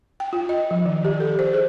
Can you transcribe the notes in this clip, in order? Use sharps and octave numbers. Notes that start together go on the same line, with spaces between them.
G5
F4
D#5
F3
D#3
G4
A4
C5
G#4